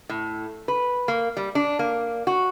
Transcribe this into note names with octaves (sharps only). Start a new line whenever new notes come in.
A2
B4
A#3
G3
D4
A#3
F#4